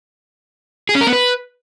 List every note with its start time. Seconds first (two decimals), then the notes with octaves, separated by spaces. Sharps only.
0.89 G#4
0.95 C#4
1.01 A#4
1.07 B3
1.13 B4